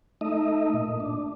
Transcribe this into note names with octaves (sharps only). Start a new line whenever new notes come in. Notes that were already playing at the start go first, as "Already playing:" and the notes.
A3 D#4 D#5 E5
A#2
D4